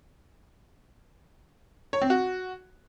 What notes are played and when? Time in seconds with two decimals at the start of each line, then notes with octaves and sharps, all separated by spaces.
1.93 C#5
2.02 C4
2.10 F#4